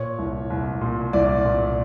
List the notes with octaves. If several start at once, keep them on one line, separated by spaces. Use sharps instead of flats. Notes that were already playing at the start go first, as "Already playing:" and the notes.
Already playing: A#2 C#5
C2
C2
A#2
C2 D5
A#2